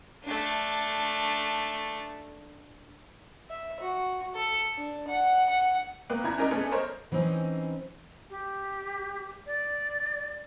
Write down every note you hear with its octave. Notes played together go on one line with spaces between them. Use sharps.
A3 D4
E5
F#4
A4
D4
F#5
F#5
A#3 B3 G5 F#6
E2 D4 E4 A#5 G#6
C#4 D4 A#4 D#5
A3 B3 C#4 D4 G#4 A4
A#4 C5 C#5 D#5
E3 C4 C#4 D#4
G4
D5